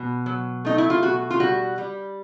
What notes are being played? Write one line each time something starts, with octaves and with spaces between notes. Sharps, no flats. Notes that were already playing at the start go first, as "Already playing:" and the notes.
Already playing: B2
F#3
A3 D#4
E4
F4
B2 F#4
F4
G3 F#4
G3